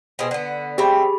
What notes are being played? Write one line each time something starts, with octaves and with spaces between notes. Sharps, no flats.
B2 C4 G#4
D3 B3
C4 G4 G#4 E5 B5